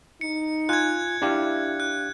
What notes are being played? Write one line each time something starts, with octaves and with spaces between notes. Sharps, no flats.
D#4 C#7
F4 G#5 F#6 G#6
D4 E4 G4 F5
F#6